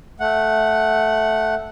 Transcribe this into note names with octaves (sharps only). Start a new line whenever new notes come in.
A3 F#5